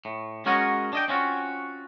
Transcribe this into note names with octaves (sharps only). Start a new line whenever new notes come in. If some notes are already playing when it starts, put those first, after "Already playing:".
A2
G#3 C#4 F#4 A#4 C#5 D#5
D4 D#5 G5
C4 C#4 F4 F#4